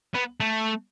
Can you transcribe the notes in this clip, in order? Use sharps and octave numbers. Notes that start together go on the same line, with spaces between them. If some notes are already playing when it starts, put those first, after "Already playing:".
B3
A3